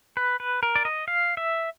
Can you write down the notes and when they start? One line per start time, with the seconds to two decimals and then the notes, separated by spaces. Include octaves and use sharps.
0.17 B4
0.40 B4
0.63 A#4
0.76 D5
0.85 D#5
1.08 F5
1.37 E5